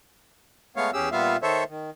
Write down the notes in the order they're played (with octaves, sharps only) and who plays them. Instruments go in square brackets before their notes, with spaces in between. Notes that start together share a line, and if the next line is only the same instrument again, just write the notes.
[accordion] G#3 A3 B3 C#5 F5
E2 C#4 G4 G#4 E6
A#2 G3 B3 F4 E5 F5
D#3 A4 C5 C#5 E5
D#3